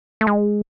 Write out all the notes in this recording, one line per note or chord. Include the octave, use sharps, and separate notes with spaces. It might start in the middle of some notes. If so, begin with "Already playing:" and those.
A3
G#3